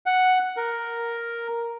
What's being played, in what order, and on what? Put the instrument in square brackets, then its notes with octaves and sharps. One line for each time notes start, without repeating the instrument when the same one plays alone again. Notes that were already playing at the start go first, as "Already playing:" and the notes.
[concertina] F#5
A#4